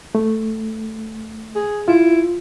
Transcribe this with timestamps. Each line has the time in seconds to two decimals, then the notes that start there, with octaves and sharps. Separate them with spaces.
0.15 A3
1.55 G#4
1.88 E4 F4